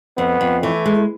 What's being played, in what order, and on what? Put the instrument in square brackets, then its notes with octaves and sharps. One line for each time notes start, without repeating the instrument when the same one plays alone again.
[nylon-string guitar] F2 [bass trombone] B3
[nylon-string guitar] F2
[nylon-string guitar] E3 [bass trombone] A3
[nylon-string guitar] G#3